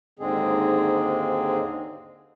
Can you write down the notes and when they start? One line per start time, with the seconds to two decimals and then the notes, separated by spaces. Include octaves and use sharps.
0.19 D#2 G#2 D3 G#3 C4 G#4